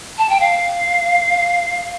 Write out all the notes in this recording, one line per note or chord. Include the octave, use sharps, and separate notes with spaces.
A5
G5
F5